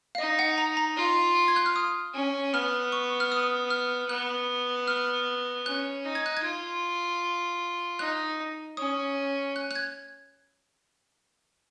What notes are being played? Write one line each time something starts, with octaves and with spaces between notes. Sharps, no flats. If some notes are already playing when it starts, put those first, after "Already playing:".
F5
D#4 D#5
F#5
A#5
A#5
F4
G#6
F#6
F6
D#6
C#4
B3 F6
C#6
F6
D#6
F6
B3 F#6
F6
C#4 F#6
D#4
G#6
F#6
G#6
F4
D#4 F#6
C#4 D#6
F#6
F#6
G#6